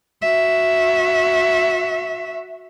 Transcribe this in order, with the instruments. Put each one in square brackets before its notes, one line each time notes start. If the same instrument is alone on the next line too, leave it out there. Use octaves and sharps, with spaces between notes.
[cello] F#4 E5